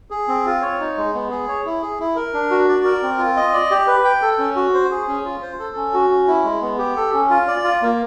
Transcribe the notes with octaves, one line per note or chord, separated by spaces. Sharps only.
G#4
C4
F4
C#5
D#4
G#3
B3
G#4
C#5
E4
G#4
E4
A#4
D4
F#4
D5
A#4
C4
F4
D#5
D5
G4
B4
G5
A4
C#4
F#4
C5
G#4
C#4
F4
C5
A4
C#4
F#4
C#4
E4
G#3
B3
G4
A4
C#4
F4
D5
F4
A#3